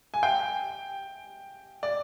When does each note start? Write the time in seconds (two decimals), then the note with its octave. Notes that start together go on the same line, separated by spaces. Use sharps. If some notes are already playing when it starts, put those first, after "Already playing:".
0.14 G#5
0.23 G5
1.83 D5